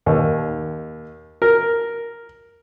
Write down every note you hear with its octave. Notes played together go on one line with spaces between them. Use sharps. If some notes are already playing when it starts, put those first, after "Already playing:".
D#2
A#4